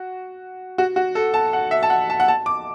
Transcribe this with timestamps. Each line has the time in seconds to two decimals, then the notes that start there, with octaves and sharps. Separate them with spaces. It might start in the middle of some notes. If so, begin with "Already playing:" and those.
Already playing: F#4
0.78 F#4
0.96 F#4
1.15 A4
1.34 A5
1.53 F#5
1.71 E5
1.83 A5
1.90 F#5
2.10 A5
2.20 F#5
2.28 A5
2.46 D6